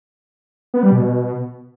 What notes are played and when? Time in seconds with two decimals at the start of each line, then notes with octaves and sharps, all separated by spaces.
0.74 B3
0.83 G3
0.92 B2